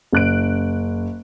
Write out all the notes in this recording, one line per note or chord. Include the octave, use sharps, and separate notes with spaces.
F#1 F#6 D7